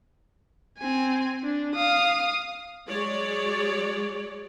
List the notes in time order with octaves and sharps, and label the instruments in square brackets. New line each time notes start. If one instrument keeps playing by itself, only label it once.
[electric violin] C4 G#5
D4
F5 D#6
[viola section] F#3 G#3 C#5 D5